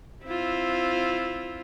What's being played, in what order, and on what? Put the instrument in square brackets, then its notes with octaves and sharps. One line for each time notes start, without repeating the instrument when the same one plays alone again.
[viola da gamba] C4 E4 F4